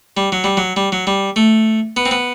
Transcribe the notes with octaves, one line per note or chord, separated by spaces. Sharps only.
G3
F#3
G3
F#3
G3
F#3
G3
A3
B3
C4
B3